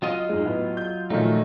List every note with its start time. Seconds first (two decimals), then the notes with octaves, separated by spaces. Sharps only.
0.02 F#3 F4 D#5
0.29 G#2 G#3
0.45 A2 B3
0.77 G6
1.10 A#2 D#3 F3 F#3 A3 D#4